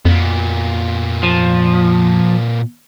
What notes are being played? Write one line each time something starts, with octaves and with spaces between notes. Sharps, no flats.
F2 A#2 B3
F3